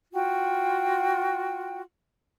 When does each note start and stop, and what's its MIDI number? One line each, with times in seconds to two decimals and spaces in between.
0.12 1.81 65
0.12 1.81 66
0.12 1.81 79